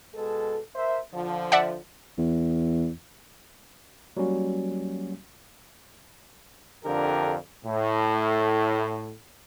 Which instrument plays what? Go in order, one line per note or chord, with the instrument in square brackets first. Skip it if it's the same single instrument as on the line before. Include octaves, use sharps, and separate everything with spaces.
[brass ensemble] B2 G#3 A4
A#4 C5 E5
D3 F3
[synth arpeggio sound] D5 E5 F#5
[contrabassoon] E2
[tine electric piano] F#3 G3 A#3 C#4 F#4
[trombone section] F2 D3 D4 F4 G4 A#4
A2